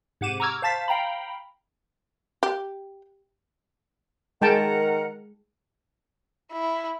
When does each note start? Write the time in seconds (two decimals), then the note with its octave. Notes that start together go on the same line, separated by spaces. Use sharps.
0.21 G#2 C3 F#5 D6 D#7 E7
0.40 A#5 C#6 D6 E6 F6 G#6
0.62 C5 F5 A5 A6 B6
0.88 F5 G5 A#5 B5
2.43 G4
4.42 D#3 G#3 A#4 F#5 G5 A5 A#5
6.53 E4